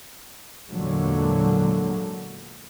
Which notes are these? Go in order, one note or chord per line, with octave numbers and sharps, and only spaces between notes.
E2 A#2 D3 F#3 G#3